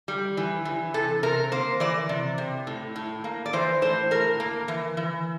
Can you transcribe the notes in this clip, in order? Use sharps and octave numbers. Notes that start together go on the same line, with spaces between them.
G3
E3
E3
C3 A4
C3 A#4
A#3 C5
E3 D5
C3
C3
A2
A2
A#3
D5
E3 C5
A2 C5
A2 A#4
A#3
E3
E3